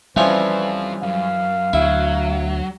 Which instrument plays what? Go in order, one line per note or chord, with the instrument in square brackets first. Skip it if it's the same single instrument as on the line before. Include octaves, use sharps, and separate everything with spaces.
[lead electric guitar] F2 F4 [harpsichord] E3 F3 C#4 [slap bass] G3 [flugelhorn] B4
[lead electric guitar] F#2 [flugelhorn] F5
[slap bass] D2 [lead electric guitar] F#3 [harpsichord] E4